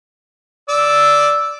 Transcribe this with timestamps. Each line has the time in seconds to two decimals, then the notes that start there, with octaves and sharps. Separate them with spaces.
0.69 D5 E6